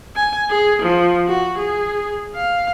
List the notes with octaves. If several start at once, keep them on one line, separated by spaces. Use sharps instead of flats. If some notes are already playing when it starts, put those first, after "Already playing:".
G#5
G#4
F3
F#4
G#4
F5